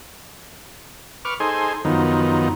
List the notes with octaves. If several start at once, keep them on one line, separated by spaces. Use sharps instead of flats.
B4 C#6 D6 F6
D#4 G#4 A4 C5 G#5 C6
F#2 D#3 F3 B3 D#4